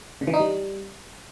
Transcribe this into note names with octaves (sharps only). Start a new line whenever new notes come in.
C#3
E3
D#4
G3